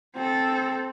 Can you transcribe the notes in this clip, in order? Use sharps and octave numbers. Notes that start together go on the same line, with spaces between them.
C4 A4